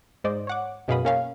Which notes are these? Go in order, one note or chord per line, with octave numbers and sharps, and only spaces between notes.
G#2 C5 D5 D#5
C#5 F#5 D6
F#2 B2 G#4 F5 B5 D#6
A#3 C#4 F5